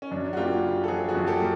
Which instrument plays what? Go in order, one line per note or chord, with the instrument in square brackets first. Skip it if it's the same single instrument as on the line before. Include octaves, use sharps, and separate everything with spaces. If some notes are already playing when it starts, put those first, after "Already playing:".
[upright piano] C#4
[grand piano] F#2 [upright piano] D4
[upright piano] F#4
[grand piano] A#3 [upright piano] F4 G4
[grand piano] C#3
[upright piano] A4
[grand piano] F3 [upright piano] F#4 G#4
[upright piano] F#4 G#4
[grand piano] F#2
[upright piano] G4 A4
[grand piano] A#3